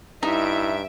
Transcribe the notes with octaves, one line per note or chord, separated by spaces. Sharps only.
G2 D#4 E4 E5 D7